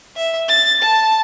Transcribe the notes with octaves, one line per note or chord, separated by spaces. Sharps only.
E5
A6
A5